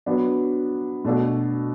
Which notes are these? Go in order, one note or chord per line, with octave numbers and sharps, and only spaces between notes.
F#3 B3 D4
B2 A3 D4 F#4 A4